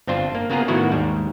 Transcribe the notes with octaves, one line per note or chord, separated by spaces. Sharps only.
G1 C4 D4 F4 C5
A#3
C#3 A#3 B3 F4 G#4 A#5
A2 D#3 F#3 B3 E4 F#4
D#2 G#2 G3